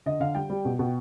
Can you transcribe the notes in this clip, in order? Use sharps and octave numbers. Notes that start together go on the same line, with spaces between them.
D3 D#5
D3 F5
G3 G5
G3
B2
B2